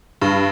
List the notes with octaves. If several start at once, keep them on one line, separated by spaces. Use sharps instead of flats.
G2